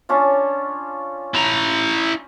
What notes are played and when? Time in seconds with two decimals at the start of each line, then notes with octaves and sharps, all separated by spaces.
0.09 C#4 D4 F4
1.35 E4 A#5